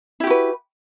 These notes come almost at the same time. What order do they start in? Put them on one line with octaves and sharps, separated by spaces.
E4 G4 F#4 B4